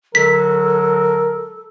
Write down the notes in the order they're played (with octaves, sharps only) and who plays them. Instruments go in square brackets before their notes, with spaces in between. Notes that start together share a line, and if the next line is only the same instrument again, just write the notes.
[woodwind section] D3 F#3 G#3 [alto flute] A4 [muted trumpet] A#4 [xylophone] B6